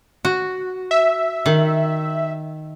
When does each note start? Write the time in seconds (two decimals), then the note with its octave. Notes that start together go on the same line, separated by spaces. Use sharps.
0.25 F#4
0.91 E5
1.46 D#3